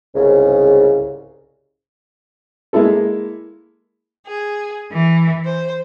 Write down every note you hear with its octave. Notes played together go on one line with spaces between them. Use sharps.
C2 G#2 C#3
G#3 A#3 E4 A4
G#4
E3
C5